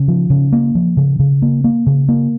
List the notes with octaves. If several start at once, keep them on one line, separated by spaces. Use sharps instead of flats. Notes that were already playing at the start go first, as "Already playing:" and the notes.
Already playing: C#3
F3
C#3
A#3
F3
C#3
C#3
A#3
A#3
C#3
A#3